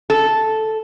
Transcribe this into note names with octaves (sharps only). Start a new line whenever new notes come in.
A4